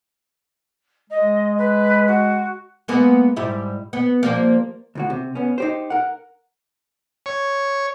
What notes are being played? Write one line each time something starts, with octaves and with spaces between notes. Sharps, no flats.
G#3 D#5
B4
F#4
G#3 A#3 B3
G#2 G3 E4
B3
F3 G3 A#3
D2 A2 F#4
C3
B3 C#4
D#4 G4 C5
A#4 F#5
C#5